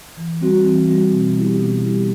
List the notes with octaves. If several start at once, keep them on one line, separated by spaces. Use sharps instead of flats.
E3
G3 C4 F#4
E3
G3 C4 F#4
B2
G3 B3 E4 G4
B2
G3 B3 E4 G4